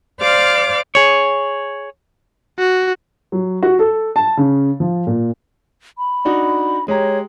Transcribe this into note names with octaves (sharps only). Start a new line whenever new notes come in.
C5 D5 F5 D6 F6
G#4 C#5
F#4
F#3
F#4
A4
A5
C#3
F3
A#2
B5
D4 D#4 F#4
G#3 G4 C#5 A#5